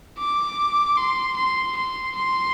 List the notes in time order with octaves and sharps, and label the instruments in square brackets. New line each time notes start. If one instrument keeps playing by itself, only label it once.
[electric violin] D6
C6
C6
C6
C6